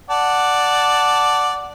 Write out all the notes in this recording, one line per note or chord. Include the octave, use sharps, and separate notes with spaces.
D5 F#5 A5